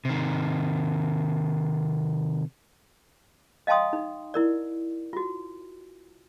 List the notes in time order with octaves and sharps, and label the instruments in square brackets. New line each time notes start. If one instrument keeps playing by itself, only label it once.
[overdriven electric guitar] C3 D#3
[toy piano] D#5 F5 G5 A5 C6 D#6
D#4
E4 A#4 D5
F4 F#4